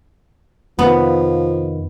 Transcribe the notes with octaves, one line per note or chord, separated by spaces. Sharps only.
F2 C3 D#3 F3 B3